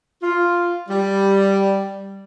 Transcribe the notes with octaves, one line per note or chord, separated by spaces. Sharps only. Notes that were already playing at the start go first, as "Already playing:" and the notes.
F4
G3